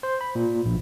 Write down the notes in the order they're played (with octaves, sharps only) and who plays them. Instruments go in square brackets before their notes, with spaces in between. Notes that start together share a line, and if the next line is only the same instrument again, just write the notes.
[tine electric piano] C5
B5
A#2
A#1